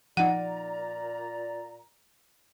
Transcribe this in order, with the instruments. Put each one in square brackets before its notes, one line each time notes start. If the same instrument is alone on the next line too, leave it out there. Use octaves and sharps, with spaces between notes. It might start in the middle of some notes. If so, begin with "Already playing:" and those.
[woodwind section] A#2 D5 A#5 [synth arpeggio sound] F3 D#4 [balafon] F#5